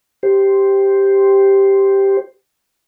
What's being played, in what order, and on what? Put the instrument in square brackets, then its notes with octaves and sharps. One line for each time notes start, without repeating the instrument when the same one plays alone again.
[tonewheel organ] G4 C5